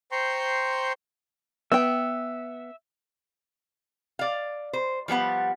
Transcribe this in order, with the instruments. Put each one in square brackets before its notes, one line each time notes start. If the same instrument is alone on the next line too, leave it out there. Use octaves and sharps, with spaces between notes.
[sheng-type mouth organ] C5 G5 A#5 C6 C#6
[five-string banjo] B3 G5 [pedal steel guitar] E5
[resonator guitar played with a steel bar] D5 F5
C5
F3 G3 B3 F#5